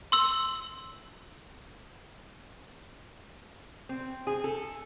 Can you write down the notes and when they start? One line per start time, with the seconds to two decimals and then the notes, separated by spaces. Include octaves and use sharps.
0.12 C6 E6 F#7
3.89 C4
4.27 G#4
4.44 A4